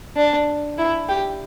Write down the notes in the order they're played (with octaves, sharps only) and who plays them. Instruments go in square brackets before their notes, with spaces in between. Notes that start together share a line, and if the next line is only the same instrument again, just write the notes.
[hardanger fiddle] D4
E4
G4